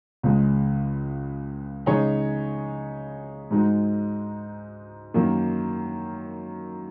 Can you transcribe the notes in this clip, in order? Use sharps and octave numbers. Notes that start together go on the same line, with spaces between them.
C#2 C#3 G#3
C#3 G#3 D#4 G#4 C#5
G#2 G#3 D#4 F#4
F#2 D#3 A#3